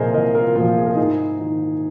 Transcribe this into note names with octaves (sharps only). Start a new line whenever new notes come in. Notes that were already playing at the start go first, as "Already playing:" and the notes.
Already playing: C2 A#2 F3 G#4 A#4 C5 D#5 G#5
C2 A#4 D#5
F4 A#4
A#2 F3 F4 A#4
G#4
A#4
G#2 D#4 G#4
D#3